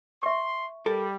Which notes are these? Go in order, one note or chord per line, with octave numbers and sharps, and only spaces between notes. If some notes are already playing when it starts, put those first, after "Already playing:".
E5 C6 C#6
G3 A4 A#4